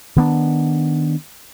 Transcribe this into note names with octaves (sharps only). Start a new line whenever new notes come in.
D#3 B3 D4